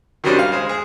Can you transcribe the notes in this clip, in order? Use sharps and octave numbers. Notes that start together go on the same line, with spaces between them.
D#3 F#3 G3 C#4 D4 C5
F5
G#3 C5
G#4